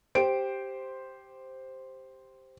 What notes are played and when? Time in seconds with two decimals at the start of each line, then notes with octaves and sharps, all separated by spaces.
0.15 G4 C5 D7